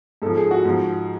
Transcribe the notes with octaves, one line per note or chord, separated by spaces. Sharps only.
G#2 F3 A4
G#4
F#4
G#2 F3